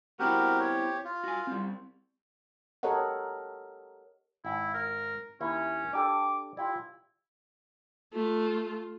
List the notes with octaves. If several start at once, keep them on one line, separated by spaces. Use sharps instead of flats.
B3 C4 E4 F#4 G4 A#4
G4 C#5
F4
F#4 G#5
G3 C4
G4 A4 A#4 C#5 D#5 F#5
G#1 E4
A#4
D#2 C#4 E4 E5
D4 G4 A4 D6
E4 F4 G4 D5
A3 F4